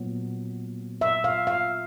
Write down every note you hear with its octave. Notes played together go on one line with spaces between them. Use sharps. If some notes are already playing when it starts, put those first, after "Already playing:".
Already playing: A#2 F#3 B3
E5
F5
F5